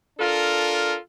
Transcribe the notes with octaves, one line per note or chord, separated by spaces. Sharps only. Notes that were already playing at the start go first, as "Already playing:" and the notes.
D4 F4 A4 A#4